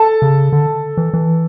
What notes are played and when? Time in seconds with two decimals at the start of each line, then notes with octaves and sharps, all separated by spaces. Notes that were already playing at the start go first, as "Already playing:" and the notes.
Already playing: A4 A5
0.22 C#3
0.52 D3
0.97 E3
1.14 E3